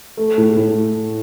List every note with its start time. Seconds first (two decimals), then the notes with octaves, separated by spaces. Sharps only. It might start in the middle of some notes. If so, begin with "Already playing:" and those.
0.17 A3
0.38 A2
0.57 A2